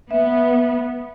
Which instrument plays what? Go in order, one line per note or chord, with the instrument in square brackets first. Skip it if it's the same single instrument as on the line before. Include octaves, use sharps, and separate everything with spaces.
[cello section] B3 [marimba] E5